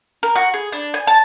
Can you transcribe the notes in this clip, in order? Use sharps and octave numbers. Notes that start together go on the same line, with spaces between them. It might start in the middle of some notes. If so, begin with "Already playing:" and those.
A#4
F#4
G#4
D4
G#5
A5